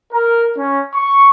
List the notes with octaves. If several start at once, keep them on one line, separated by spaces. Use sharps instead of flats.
A#4
C#4
C#6